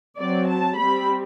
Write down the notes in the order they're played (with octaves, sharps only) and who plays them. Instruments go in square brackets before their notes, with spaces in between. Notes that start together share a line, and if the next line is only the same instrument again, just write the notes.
[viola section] F#3 C4 D5
A5
G3 C4 B5